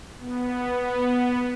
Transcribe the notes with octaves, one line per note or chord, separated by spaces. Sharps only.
B3